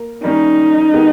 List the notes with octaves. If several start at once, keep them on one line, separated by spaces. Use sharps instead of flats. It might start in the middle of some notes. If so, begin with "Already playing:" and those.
Already playing: A#3
D#3 G3 A#3 C#4 D#4
D#3 G#3 B3 G4